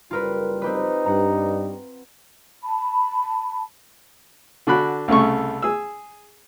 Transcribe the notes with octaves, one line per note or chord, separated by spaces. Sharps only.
F#1 G3 F4 A#4 B4
C4 D#4 G4 B4
G2 G3 F#5 A#5
A5 B5
D3 D4 F#4 B5 F#6
C2 C#3 A3 C#6
G#4 E6